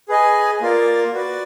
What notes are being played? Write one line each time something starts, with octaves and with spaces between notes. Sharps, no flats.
G#4 B4 D#5 G#5
A#3 F4 A#4 D5
F#4 B4 D5